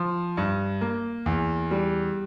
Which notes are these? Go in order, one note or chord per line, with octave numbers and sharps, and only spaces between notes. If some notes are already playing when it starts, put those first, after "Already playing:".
Already playing: F3
G2
A#3
E2
G3